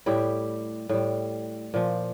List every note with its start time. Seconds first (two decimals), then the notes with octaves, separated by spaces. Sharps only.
0.06 A2 G3 E4 G4
0.89 A2 G3
1.74 A#2 F3